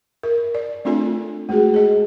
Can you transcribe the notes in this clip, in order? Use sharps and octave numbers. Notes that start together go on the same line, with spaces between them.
A#4
D5
A3 C4 D4 F4 A4 G#5
G#3 A3 F#4 G#4
G#4 D#5